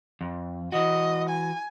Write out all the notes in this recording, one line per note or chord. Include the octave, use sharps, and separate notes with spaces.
F2
E3 F#4 D#5
G#5